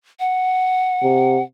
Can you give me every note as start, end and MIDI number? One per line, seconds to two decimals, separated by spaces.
0.20 1.42 78
1.03 1.41 48